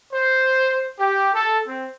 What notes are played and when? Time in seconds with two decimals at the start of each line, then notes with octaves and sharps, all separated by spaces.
0.13 C5
0.99 G4
1.34 A4
1.67 C4